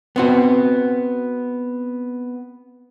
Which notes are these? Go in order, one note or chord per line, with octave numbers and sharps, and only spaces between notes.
B3 C4 F#4